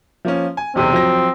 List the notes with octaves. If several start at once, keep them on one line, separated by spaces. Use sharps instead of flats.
F3 A#3 C#4
G#5
B1 E2 C3 C4
F3 F#3 A#6